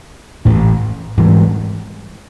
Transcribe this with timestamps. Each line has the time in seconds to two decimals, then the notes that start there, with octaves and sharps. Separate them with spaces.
0.45 A1 A2 E3 A3
1.17 G#2 E3 G3